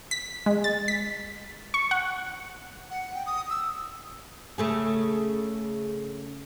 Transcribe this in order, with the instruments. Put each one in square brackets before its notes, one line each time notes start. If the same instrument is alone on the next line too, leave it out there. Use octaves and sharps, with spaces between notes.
[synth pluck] B6
G#3
A6
B6
C#6
F#5
[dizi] F#5
G5
D#6
E6
[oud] C#3 A3 G#4